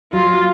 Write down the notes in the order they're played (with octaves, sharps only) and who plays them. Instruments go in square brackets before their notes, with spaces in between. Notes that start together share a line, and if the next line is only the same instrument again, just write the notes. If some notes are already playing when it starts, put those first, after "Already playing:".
[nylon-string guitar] F#3 [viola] F4